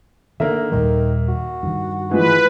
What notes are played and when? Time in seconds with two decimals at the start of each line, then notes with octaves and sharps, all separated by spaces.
0.40 D3 D#3 A#3 A#4 E5
0.72 D#2 A#2 D#3 G3
1.29 F#4
1.63 G2 D#3
2.11 E3 F3 G#3 B4